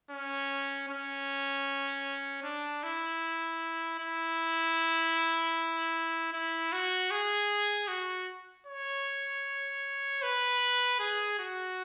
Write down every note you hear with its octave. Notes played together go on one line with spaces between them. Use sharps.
C#4
C#4
D4
E4
E4
E4
F#4
G#4
F#4
C#5
B4
G#4
F#4